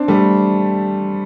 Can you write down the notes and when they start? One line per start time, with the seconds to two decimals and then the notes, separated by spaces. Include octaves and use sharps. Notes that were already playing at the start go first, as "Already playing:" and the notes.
Already playing: C4 D4
0.08 G3 A3